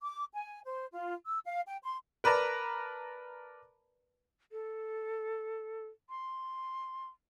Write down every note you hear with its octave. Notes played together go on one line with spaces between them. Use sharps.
D6
G#5
C5
F4
E6
F5
G5
C6
A#4 B4 D5 A5 A#5
A4
C6